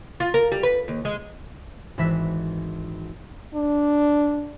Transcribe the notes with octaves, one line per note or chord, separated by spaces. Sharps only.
F4
A#4
G3
B4
D#2
G#3
G#1 E3 B4 E5 A#6 B6
D4